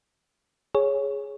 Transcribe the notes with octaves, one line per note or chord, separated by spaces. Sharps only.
G#4 C#5